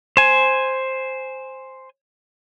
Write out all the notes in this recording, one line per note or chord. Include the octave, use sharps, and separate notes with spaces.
C5 G#5